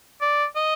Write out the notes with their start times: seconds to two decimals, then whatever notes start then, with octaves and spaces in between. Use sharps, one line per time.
0.21 D5
0.56 D#5